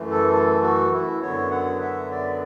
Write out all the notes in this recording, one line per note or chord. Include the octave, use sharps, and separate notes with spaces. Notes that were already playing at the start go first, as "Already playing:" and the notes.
Already playing: F#2 E3 A3
A4
A4
F#4
E4
F#2 D3 F#3 B3 C#5
F#5
E5
D5